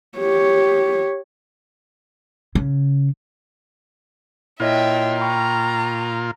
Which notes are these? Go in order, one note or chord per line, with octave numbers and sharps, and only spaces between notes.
G4 C#5
C#3
A#2 E4 F4 C#5 D#5 E5 G5
G5 A#5 B5 C#6